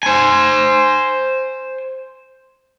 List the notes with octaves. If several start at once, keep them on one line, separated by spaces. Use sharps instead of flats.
C5 G#5